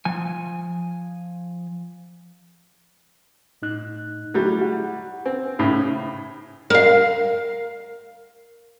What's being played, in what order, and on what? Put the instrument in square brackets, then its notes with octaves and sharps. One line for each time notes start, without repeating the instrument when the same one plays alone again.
[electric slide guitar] F3 G#5
[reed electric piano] A2 D#4 F#6
[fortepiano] F#3 G3 [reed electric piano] A3 E4 G#4
[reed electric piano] F#5
[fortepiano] C4 [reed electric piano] G#5
[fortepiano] A2 C#3
[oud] A#4 F5